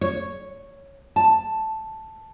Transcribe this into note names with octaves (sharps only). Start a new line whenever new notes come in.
C#5
A5